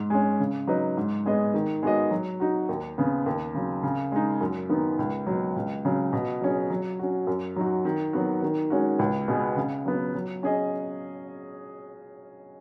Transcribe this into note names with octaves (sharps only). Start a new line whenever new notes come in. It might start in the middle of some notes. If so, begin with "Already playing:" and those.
Already playing: G#2
G#3 C#4
C#3
F#3 D#4 B4 D#5
G#2
G#3 B3 G#4 D#5
D#3
G#3 B3 F#4 D#5
F#3
D#4 F#4
D#2
C#3 B3
D#2
C#3 F#3
C#3
G#3 D#4
F#2
D#3 B3 D#4
C#2
B2 F#3
C#2
C#3 F#3
B2
F#3 C#4 G#4
F#3
C#4 F#4
F#2
F#3 D#4 F#4
D#3
F#3 B3 F#4
D#3
G#3 C#4 F#4
C#2
B2 G#3 B3
C#3
F#3 B3
F#3
C#4 G#4 D#5